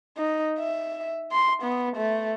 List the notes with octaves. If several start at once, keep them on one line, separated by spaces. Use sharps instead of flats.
D#4
E5
C6
B3
A3